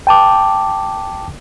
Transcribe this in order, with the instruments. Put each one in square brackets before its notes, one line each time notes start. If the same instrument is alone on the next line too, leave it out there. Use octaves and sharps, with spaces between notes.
[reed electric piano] G5 A5 D6